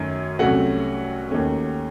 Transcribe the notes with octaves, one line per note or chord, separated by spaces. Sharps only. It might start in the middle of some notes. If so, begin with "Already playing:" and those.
Already playing: F#2 D#3 A3 C#4
C2 C3 F#3 A3 C#4 F#4 F#5
D#2 D#3 A3 C#4